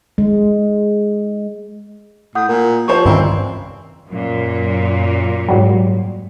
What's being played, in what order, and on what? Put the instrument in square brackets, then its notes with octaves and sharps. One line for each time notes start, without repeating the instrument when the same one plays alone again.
[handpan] G#3
[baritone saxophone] A2 [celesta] F#5 D#6 G6
[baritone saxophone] A#2 [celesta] A#4
[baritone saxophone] F3 [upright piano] G4 C5 C#5 [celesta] C#6
[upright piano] C#2 E4 D5 [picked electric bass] G2 D#3 E3 [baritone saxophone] C4
[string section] F#2 A#2
[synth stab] G#2 F#3 G3